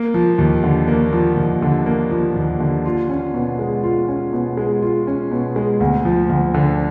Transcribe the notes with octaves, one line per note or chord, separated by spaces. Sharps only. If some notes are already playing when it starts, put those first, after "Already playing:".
Already playing: A#3
F3
D#2
D3
A#3
F3
D#2
D3
A#3
F3
D#2
D3
F4
C#4
B2
G#3
F4
C#4
B2
G#3
F4
C#4
B2
G#3
D2
F3
D2
D3